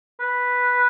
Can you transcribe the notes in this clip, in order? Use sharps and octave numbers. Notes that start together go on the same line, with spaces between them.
B4